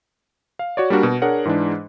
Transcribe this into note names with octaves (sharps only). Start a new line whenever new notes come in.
F5
F#4 C#5 D5
G3 A#3 D4 F#4 A#4
B2
D4 G#4 A#4 C#5 F#5
G#2 E3 G#3 D4